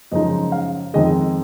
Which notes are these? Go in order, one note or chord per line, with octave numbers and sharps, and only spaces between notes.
F#2 C#3 F3 G#3 D#4 D#5
F5
F2 D#3 G#3 D#5